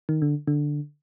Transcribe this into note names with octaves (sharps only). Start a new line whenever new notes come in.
D#3
D3
D3